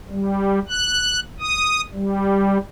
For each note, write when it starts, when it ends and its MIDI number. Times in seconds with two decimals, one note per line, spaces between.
0.11 0.59 55
0.69 1.19 90
1.40 1.81 87
1.94 2.58 55